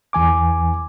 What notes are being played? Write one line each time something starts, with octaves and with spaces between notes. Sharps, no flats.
E2 E3 G#5 D6